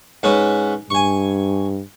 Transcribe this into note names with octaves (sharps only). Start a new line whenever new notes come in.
G#2 C#4 B4
G2 G#5 C#6